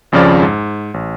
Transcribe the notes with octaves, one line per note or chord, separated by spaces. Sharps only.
G#1 F2 C#3 F3 D5
G#2
A1